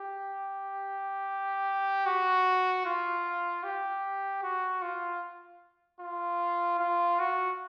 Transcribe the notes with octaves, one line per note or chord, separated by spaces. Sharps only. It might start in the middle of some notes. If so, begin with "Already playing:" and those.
Already playing: G4
F#4
F4
G4
F#4
F4
F4
F4
F#4